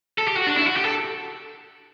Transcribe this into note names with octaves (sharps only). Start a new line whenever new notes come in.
A4
G4
F#4
D4
E4
F#4
G4
A4